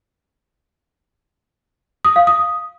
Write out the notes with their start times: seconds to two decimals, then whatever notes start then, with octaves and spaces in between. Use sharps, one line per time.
2.05 D#6
2.16 F5
2.27 D#6